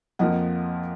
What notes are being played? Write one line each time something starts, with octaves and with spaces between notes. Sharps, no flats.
F2 F3 A#3 D#5 F#5